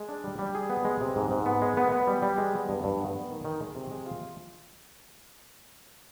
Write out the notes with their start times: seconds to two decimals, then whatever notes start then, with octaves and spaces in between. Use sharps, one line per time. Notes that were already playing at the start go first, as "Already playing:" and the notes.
Already playing: G#3
0.09 D4
0.24 G3
0.39 G3
0.55 G#4
0.70 B3
0.85 G#3
1.01 C3
1.16 G#2
1.31 G#2
1.46 B3
1.62 G#3
1.77 B3
1.92 B3
2.07 G3
2.22 G3
2.38 G#3
2.54 B3
2.69 G2
2.84 G2
3.00 B3
3.14 B3
3.30 D#3
3.45 D#3
3.61 G#3
3.75 C3
3.91 G#3
4.06 F4